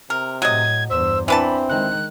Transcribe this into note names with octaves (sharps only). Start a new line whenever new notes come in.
C3 A#4
A2 F#3 D#5 G#6
E2 G2 C5 E6
E3 C4 D4 B4 A5 B5
D#3 G#3 F#6